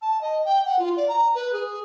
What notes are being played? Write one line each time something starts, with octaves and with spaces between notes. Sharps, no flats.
A5
D#5
G5
F#5
F4
D5
A#5
B4
G#4